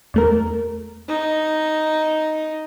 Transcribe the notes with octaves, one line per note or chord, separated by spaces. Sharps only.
E2 A3 A#4
D#4